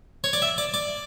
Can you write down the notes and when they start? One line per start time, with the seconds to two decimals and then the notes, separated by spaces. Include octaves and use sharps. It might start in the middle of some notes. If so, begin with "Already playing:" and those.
0.24 C#5
0.33 D5
0.42 E5
0.58 D5
0.74 D5